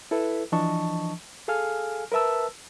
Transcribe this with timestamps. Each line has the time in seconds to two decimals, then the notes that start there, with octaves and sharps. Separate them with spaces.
0.11 E4 A4 B4 E5
0.52 E3 F3 D4 D#5 A5 C#6
1.48 G#4 A4 F5 G#5 F6
2.12 A#4 B4 E5 A5 E6